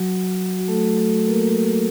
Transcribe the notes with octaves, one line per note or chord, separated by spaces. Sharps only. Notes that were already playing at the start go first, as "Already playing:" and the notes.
Already playing: F#3 F#4
F#4
A3 A4
A3 A4
A#3 A#4